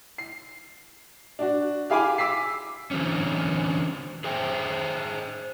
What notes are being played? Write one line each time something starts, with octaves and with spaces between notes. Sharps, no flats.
C7
D4 F#4
G4 G#4 F5 G#5 B5 D6
D6 E6 B6 C7
D3 E3 F#3 C4 C#4
G#4 C5 E5 G5